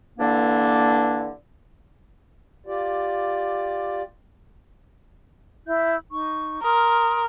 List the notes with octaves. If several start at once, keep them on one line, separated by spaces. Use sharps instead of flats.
G2 D3 E3 A#3 D4
F4 G4 D5
E4 E5 G6
D#4 C#6
A#4 C6 D#6 F6